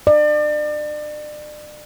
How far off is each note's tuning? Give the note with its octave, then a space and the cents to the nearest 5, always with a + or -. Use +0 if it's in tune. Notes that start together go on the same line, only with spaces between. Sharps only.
D5 +35